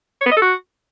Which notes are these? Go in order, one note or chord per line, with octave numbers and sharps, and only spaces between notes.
C#5
B3
D#5
A4
F#4